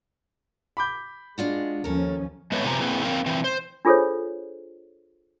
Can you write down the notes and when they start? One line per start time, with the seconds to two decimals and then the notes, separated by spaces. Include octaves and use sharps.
0.77 B5 D6 G6
1.38 G#3 D4 F4 F#4
1.84 D#2 F3 C#4 A4 A#4
2.52 G#3 A3 B3 B4 C#5
2.65 C3 F3 G4 B4 G#5 A#5
2.81 A#3 C4 E4 G#4 B4
3.03 C4 A#4 F5
3.26 E3 C4
3.44 C5
3.85 D4 F4 G#4 A4 C5 C#5